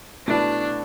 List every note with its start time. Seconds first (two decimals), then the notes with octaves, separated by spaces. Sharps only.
0.27 B2 A3 D4 E4